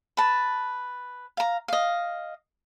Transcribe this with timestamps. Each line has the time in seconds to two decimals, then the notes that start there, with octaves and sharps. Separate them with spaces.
0.17 B4 A5
1.37 F5 A#5
1.68 D#5 F5